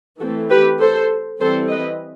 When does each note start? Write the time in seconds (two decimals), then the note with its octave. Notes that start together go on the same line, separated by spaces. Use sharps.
0.20 E3 A3 C4 F#4 A4
0.50 G4 B4
0.80 A4 C5
1.40 E3 G3 C4 A4 C5
1.70 B4 D#5